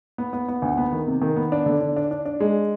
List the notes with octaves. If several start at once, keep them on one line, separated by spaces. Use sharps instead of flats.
B3
B3
B3
D2
B3
D#3
C3
D#3
B3
D4
D3
D4
D4
D4
D4
G#3